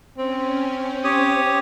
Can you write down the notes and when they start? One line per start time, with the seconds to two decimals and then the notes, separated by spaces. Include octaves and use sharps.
0.18 C4 C#4
1.04 G4 C#5 D#6